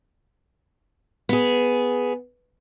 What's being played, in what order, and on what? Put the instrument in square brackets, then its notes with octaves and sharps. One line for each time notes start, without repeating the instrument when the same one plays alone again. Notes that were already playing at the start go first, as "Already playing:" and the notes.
[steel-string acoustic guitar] B3 G#4